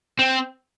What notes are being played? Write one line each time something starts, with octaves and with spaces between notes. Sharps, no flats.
C4